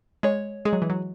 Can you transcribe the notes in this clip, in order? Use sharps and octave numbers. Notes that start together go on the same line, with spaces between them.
G#3 C#5
G#3 G#4
F#3
E3
F#3